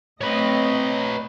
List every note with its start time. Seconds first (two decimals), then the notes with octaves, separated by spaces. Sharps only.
0.21 A3 C4 B4 C#5 D#5